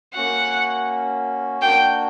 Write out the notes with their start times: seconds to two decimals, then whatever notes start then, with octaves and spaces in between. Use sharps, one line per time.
0.15 A#3 C#4 F#4 F#5
1.62 A#3 D4 F#4 G5